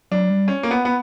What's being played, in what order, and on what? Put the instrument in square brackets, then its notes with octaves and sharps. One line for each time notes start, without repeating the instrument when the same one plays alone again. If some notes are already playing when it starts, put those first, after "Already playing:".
[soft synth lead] F#3 [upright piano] D4
[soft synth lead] G3
[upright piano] C#4
A#3
B3
B3